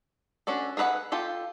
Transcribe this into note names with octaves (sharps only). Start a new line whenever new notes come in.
C#4 D4 F#4 A4
G#4 A4 B4 E5 F#5
F4 G4 A4